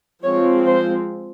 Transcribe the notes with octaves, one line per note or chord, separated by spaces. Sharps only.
F3 G#3 C4 C#5
C5